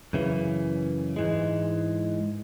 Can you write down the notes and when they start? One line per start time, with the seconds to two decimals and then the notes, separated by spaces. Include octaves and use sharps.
0.13 F#2 C#3 E3
1.16 G#2 E3 G#3